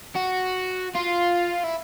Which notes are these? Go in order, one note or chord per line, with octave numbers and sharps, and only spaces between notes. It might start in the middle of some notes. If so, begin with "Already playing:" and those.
F#4
F4
E4